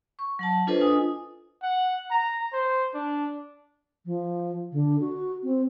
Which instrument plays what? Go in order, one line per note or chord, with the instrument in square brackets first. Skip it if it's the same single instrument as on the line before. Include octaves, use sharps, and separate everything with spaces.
[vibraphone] C#6
F#3 F#5 A5
D4 F4 A4 B4 C5 D#5
D4 F4 G#5 D#6
[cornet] F#5
A#5
C5
D4
[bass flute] F3
D3
F#4
C4